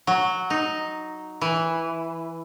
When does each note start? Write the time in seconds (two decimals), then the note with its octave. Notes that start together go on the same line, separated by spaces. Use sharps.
0.07 F#3
0.50 D#4
1.41 E3